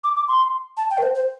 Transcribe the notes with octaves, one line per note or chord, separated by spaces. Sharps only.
D6
D6
C6
A5
G5
A#4
C5
C5